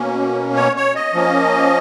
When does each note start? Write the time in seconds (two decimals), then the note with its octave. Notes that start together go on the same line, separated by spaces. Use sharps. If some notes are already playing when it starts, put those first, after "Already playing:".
Already playing: B2 A#3 C#4
0.56 C#5
0.76 C#5
0.95 D#5
1.14 F3 A#3 C#4